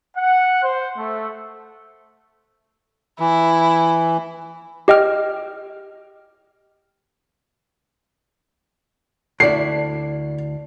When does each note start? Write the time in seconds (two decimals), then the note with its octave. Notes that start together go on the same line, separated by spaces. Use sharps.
0.15 F#5
0.63 C5
0.96 A3
3.20 E3 E4
4.88 G4 D#5 G5 F6
9.40 D2 E4 A4 D5 C7